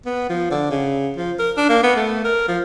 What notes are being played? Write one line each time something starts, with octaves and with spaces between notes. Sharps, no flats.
B3
F3
D3
C#3
F3
A#4
D4
A#3
B3
A3
A#4
F3